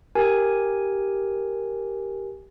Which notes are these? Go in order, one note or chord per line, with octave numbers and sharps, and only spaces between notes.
G4 A#4 G#5